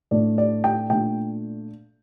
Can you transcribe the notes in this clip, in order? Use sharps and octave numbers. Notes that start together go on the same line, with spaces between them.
A2 A3 D4 D5
D5
G5
A#2 A3 D4 G5